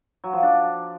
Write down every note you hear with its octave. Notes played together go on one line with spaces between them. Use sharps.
F#3
F3
D4